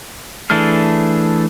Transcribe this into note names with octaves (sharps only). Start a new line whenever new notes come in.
E3 A3 D4 G#4 F6